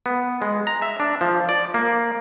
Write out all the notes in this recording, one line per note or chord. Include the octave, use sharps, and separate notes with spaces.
B3
G#3
A#5
E5
D4
F3
D5
A#3